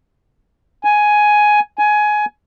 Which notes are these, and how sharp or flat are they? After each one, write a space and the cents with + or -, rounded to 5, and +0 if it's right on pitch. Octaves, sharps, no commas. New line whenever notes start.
G#5 +10
G#5 +20